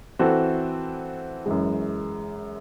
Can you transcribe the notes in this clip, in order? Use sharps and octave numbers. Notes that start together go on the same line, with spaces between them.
E3 C4 F#4 A4
F#2 E3 G#3